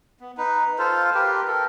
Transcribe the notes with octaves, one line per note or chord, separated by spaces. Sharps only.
B3
D#4 B4
F4 A4 C5 F5
G4 A#4 B4 G5
A4 A#4